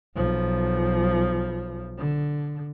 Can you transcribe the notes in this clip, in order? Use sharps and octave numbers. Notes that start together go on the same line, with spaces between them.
B1 F3
D3